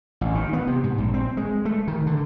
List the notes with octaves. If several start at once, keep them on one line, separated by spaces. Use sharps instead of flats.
A1
D#3
B3
C3
G#2
A#1
C4
G#3
A3
D#3
D3